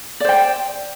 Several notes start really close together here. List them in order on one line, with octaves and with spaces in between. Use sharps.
D5 C5 G5